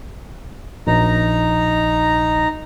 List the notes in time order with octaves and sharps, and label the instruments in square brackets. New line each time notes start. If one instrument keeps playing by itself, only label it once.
[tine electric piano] A#1 [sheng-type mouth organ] D#4 A#5